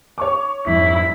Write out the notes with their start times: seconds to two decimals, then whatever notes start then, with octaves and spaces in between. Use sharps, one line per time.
0.18 C#5 C#6 D6
0.67 F2 G#2 E4 B6